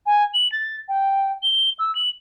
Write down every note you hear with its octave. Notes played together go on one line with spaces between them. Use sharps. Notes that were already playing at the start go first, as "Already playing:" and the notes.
G#5
F#7
A6
G5
G7
E6
F#7